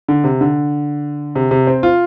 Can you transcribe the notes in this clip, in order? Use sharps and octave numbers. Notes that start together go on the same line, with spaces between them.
D3
C3
D3
C3
C3
C4
F4